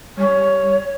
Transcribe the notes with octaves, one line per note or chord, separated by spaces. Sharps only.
G3 C#5